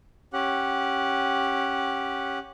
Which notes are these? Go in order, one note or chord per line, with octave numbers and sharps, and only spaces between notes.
C#4 G4 F#5